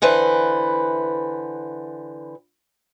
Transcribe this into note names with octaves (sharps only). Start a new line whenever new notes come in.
D3 E3 B4 C5